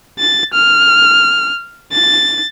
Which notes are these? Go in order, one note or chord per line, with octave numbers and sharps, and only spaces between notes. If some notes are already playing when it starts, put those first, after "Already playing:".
A6
F6
A6